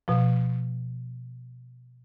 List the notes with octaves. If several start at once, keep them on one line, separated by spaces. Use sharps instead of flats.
B2 F3